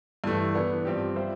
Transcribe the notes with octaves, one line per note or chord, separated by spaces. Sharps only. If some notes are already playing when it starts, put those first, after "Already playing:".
G2 E3 A3
E3 B3 D4
G2 F3 C4 G4
G3 C4 F4 C5 E5